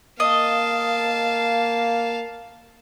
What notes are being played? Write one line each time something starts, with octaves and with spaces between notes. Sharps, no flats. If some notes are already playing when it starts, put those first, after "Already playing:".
A#3 D#5 F5 A5